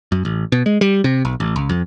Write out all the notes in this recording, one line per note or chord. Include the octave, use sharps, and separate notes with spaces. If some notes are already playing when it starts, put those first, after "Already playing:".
F#2
A1
B2
G#3
G3
C3
B1
A1
C#2
F2